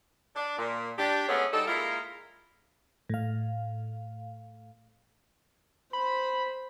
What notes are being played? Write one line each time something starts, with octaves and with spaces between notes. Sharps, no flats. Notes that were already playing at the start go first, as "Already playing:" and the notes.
D4
A#2
D4 G4
G#3 A3 B3 C#4
G3 D#4 A4
G#3 A#3 E4 F4 A#4
A2 F5
C5 B5